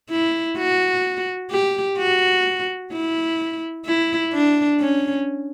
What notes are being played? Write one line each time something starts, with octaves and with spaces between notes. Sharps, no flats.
E4
F#4
G4
F#4
E4
E4
D4
C#4